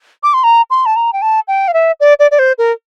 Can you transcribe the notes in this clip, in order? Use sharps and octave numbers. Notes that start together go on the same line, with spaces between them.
D6
C6
A#5
C6
A5
A#5
G5
A5
G5
F5
E5
D5
D5
D5
C5
A#4